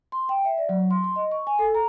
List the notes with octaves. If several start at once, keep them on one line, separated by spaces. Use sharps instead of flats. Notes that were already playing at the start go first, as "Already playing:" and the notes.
C6
G5
E5
D5
F#3
C6
C6
D#5
C#6
G#5
A4
A#5